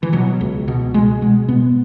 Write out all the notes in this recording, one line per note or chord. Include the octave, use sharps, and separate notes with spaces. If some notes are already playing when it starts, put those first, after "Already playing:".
E3
B2 F#3
C#2
B2
B2 G#3
B2 G#3
B2 B3